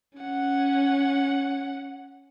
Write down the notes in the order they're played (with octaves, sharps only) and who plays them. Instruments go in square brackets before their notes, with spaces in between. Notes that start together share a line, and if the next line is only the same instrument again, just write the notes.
[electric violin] C#4 F#5